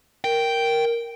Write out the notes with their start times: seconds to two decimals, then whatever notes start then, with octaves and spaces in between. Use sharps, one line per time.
0.24 A#4 G5